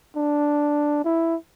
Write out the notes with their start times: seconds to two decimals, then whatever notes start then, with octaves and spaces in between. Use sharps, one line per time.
0.16 D4
1.05 E4